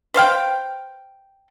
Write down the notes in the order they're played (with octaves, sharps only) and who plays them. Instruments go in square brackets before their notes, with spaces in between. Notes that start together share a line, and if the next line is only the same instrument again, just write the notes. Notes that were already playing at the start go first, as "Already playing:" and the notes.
[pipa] B4 C5 F5 G5